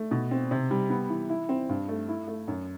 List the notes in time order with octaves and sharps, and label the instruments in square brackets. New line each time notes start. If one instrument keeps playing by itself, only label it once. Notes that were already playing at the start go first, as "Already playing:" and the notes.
Already playing: [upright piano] A3
B2
C4
C3
G3
B3
E3
E4
C4
G2
A3
E4
A3
F#2